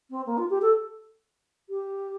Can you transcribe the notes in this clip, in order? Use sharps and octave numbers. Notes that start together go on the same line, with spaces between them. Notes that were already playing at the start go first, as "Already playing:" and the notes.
C4
A#3
F4
G4
A4
G4